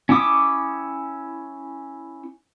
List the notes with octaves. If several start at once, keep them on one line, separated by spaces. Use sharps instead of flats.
C#4 E4 G5 D6 D#6